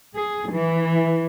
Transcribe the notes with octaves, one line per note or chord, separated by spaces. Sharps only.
G#4
E3